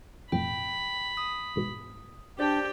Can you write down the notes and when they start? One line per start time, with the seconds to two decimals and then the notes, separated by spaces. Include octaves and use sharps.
0.32 B1 F2 A2 G5 B5
1.17 D#6
1.56 A1 G#2 B2
2.39 D4 G4 C5 D5 G5